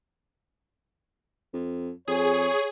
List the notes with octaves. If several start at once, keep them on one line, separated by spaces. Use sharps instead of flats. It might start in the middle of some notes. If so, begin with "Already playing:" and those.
F2
F2 G#4 C#5